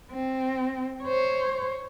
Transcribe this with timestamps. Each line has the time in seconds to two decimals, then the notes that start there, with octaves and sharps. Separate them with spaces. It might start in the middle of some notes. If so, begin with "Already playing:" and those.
0.12 C4
1.03 C5 C#5